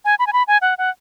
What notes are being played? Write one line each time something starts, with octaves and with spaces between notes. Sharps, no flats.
G#5
B5
G#5
B5
G#5
F#5
F#5